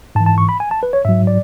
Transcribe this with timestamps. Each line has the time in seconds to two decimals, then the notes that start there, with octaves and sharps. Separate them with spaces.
0.15 G#2 A5
0.20 E3
0.26 A5
0.38 C#6
0.49 B5
0.60 G#5
0.71 A5
0.83 B4
0.93 C#5
1.05 G#2 F#3 E5
1.27 D5